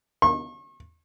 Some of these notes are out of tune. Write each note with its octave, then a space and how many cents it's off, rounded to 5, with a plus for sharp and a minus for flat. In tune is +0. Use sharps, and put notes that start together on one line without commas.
C#6 -40